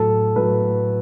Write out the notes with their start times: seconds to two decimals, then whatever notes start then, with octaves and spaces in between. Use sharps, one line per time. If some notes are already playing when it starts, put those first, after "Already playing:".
Already playing: A2 F#3 A3 A4
0.36 A2 F#3 A3 B4